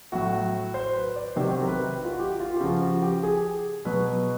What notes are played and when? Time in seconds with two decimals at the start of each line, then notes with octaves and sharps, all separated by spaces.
0.12 A2 F#3 F#4
0.74 C5
0.94 B4
1.16 D5
1.36 C3 D#3 F#3 C5
1.62 A#4
1.67 B4
2.05 F4
2.12 F#4
2.19 G4
2.40 F4
2.56 G4
2.60 C#3 F3 F#4
2.82 F#4
3.02 G4
3.23 G#4
3.85 B2 F#3 B4